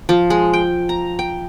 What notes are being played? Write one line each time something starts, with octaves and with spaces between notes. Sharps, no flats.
F3
G#3
G5
A#5
G5